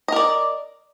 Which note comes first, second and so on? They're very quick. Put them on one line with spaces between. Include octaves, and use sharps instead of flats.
D#5 A#4 D5